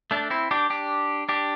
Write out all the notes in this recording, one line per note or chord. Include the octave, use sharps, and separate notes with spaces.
A3 D4
C4 E4
D4 G4
D4 G4
D4 G4